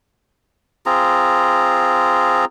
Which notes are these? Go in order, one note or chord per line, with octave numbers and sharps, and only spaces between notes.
C4 F4 G#4 A#5